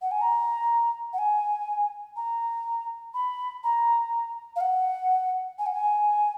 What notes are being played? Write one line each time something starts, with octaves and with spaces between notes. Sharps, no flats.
F#5
G#5
A#5
F#5
G#5
A#5
B5
A#5
F5
F#5
G#5
F#5
G#5